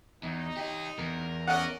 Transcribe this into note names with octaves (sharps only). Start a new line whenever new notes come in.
E2 D#4
G4 D#5
E2 A#4
C#4 D5 D#5 F#5